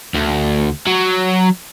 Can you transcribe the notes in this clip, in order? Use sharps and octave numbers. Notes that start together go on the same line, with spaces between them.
D2
F#3